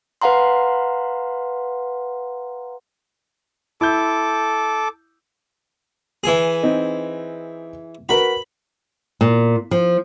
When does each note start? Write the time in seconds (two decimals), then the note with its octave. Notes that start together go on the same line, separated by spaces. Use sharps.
0.22 B4 F5 F#5 A#5 C6
3.81 E4 A4 D6 G6
6.24 E3 G#4
6.63 C4 D#4 B4
8.09 F#4 A#4 B4 B5
9.21 A#2
9.71 F3